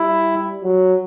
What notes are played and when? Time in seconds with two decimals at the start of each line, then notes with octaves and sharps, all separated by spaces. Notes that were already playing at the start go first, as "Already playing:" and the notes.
Already playing: G3 E4
0.63 F#3